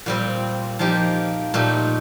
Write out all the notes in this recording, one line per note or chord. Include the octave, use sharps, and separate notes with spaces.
A#2 G3 C4
F3 A#3 D#4 G4
A#2 A3 D#4 G4